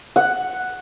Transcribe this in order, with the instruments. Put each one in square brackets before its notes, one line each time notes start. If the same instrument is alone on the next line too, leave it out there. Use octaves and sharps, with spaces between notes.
[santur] F#5